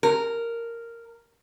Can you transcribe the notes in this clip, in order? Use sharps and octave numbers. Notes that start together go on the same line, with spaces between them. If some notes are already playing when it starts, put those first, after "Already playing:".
A#4